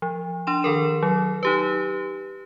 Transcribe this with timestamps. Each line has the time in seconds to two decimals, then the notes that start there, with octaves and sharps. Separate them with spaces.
0.02 F3
0.47 D4 C6 E7
0.63 D#3 A4 A#4 E7
1.03 F#3
1.43 D#4 G4 B4